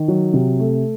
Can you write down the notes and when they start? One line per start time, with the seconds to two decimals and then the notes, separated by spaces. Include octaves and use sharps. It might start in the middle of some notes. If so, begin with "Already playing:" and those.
Already playing: D#3
0.08 F#3
0.33 C3
0.60 A3